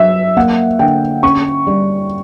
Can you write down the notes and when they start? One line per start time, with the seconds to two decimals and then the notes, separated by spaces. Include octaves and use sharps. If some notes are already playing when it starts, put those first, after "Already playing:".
Already playing: F#3 E5
0.37 A#3 F#5
0.79 D3 G5
1.23 C#4 C#6
1.67 G3